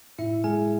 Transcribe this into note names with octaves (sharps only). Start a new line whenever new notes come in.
A2 E4 E5
G#3 G#4 G#5